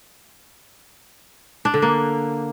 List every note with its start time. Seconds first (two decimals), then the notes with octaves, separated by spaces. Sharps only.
1.65 D4
1.74 D3
1.82 A#3